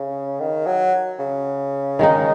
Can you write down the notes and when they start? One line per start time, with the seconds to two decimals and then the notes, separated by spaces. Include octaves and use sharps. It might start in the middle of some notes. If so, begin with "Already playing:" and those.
Already playing: C#3
0.40 D#3
0.67 F#3
1.19 C#3
1.99 D#3 G#3 D#4